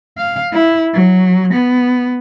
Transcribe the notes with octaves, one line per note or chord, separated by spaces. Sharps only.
F5
E4
F#3
B3